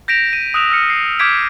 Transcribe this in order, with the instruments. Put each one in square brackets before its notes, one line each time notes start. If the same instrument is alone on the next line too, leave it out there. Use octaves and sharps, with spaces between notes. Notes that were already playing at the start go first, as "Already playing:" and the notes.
[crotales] G6 A#6 B6 D7 E7 F7
D#7
D#6 E6 F#6 D7 E7 F7
E6 F6 C#7
C7
D6 F6 G6 G#6 B6 D7